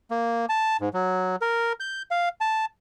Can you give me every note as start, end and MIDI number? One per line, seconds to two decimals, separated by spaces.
0.11 0.46 58
0.49 0.77 81
0.81 0.89 44
0.94 1.36 54
1.42 1.73 70
1.80 2.03 91
2.11 2.29 77
2.41 2.65 81